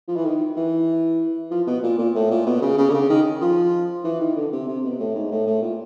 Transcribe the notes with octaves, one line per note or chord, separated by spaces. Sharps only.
F3
E3
D#3
E3
F3
B2
A#2
A#2
A2
A#2
B2
C#3
C#3
D3
C#3
D#3
F3
E3
D#3
D3
C3
C3
B2
A2
G#2
A2
A2
A#2